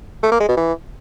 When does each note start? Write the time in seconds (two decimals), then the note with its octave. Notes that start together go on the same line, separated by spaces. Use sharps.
0.23 A3
0.31 A#3
0.40 G#3
0.48 B2
0.57 E3